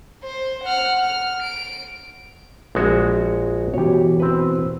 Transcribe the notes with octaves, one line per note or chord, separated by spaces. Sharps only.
C5
F#5 F6
F6
D7
A#1 G#3 F#4
B2 E3 G4 C#5
C4 B4